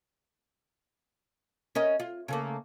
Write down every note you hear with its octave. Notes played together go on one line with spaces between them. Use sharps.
C#4 A#4 D#5
F4
C#3 A3 A#3